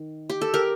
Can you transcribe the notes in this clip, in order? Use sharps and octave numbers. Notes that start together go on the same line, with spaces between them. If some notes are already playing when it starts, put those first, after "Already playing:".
Already playing: D#3
G4
A4
G4 A#4